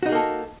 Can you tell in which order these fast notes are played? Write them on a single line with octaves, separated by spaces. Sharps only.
F#4 D#4 G#4 A#3 A4